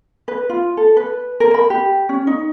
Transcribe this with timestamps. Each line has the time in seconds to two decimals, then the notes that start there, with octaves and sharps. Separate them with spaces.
0.28 B4
0.49 F4
0.77 A4
0.97 B4
1.40 A#4
1.54 B5
1.70 G4
2.09 C#4
2.27 D#4